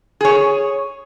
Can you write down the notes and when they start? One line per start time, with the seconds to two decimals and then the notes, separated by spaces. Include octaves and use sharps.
0.21 G#4 C#5